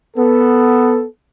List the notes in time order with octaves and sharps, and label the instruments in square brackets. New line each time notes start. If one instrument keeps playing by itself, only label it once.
[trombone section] B3 A4